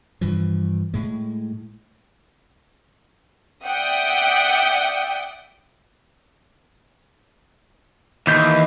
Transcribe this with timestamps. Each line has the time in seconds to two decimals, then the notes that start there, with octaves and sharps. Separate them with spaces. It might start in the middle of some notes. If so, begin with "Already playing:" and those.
0.21 G2 E3 F3
0.94 A2 G#3
3.66 D5 E5 F#5 G5 D#6
8.27 D#2 E3 G6